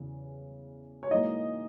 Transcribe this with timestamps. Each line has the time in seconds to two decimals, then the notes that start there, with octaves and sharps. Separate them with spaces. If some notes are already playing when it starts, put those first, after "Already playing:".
Already playing: E2 C#3 E3
1.03 C#5
1.11 G#2 E3 A#3 D#4 D#5